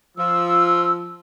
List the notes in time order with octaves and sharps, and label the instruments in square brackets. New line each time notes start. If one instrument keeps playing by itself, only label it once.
[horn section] F3 [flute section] E6